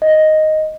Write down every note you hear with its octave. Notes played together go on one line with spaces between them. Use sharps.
D#5